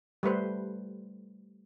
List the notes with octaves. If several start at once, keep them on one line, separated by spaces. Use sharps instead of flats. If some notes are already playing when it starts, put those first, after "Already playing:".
G3 A3 B4 C5